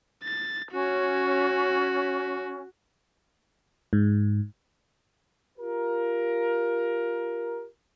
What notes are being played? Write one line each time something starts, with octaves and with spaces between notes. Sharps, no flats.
A6
C#4 F#4
G#2
F4 G4 A#4